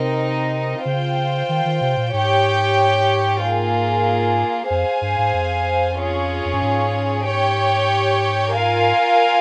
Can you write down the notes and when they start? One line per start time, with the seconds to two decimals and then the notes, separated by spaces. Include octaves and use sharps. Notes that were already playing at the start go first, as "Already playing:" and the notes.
Already playing: C3 C4 D#4 A#4 D#5
0.85 C#3 F4 C5 G5
1.49 D#3
1.66 D#3
1.81 C3
1.97 A#2
2.13 G#2 G4 C#5 G5
3.42 A#3 F4 G#4
4.70 F2 G#4 C5 F5 G#5
5.02 G2
5.18 G#2
5.34 F2
5.98 C#4 F4 G#4 C#5
6.45 F2
6.54 G2
6.62 G#2
7.26 G4 C#5 G5
8.54 F4 A#4 F5 G#5